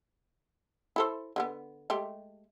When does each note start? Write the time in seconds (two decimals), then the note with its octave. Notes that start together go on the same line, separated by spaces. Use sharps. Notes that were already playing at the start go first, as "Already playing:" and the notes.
0.96 E4 A4 C5
1.36 D3 G#3 B3
1.90 G#3 A3 G4